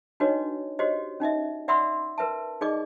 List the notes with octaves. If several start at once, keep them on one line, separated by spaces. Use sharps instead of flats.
D4 D#4 F#4 B4 C#5 D#5
F#4 G4 C5 C#5 D#5
C#4 D#4 D#5 E5
D5 E5 F#5 B5 C6 E6
A#4 B4 E5 A5
D#4 G#4 D5 D#5 D6